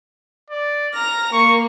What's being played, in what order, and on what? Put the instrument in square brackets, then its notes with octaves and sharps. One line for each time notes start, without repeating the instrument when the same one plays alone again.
[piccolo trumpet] D5
[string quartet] A#5 A#6 [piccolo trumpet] F6
[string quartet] A#3 [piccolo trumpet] C#6